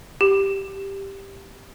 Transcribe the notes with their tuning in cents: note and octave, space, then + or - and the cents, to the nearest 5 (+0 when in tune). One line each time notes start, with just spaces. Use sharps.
G4 +0